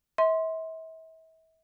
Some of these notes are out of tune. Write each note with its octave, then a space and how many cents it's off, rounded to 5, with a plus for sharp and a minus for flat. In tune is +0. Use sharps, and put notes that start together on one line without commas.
E5 -40 C6 +0